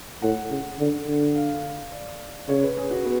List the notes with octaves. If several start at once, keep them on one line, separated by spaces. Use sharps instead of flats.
A2 F#5
C#3
D3
D3
F5
D5
C#3 C#5
B4
G#4
F#4
B3